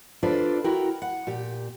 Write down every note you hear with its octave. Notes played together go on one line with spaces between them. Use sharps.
D4 F4 A4 B4 C5 D5
E4 F#4 A#4 G5
F#5
A#2 G4